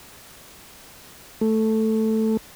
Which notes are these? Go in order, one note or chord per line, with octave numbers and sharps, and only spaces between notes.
A3